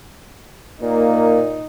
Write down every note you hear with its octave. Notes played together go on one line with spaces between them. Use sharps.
A#2 A#3 D#4